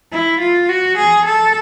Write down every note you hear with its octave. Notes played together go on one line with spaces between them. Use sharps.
E4
F4
F#4
G#4
A4